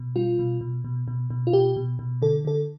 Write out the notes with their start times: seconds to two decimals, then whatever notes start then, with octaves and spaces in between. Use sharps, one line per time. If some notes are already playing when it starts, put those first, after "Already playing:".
Already playing: B2
0.16 G3 F4
0.39 B2
0.61 B2
0.84 B2
1.08 B2
1.30 B2
1.47 F4
1.53 B2 G4
1.76 B2
1.99 B2
2.22 D3 A4
2.45 D3 A4